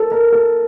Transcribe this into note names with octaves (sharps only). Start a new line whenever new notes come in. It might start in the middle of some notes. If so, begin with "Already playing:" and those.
Already playing: A4 A#4
A#4
A4